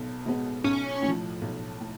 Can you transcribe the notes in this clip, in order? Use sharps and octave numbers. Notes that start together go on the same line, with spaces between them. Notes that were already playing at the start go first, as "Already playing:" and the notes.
Already playing: B1 B2 B3
B2 G#3 B3
B1 C#4
A2 F3
B1
A2